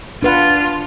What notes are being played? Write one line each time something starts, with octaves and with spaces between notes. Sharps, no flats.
D4 F4 B4 F#5